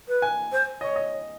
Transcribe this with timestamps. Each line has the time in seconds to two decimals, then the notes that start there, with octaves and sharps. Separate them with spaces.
0.08 B4
0.22 G#5
0.52 C5
0.81 C#5 D#5
0.96 D#5